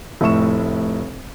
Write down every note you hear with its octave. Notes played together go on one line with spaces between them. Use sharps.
F1 A2 E5 C#6 E7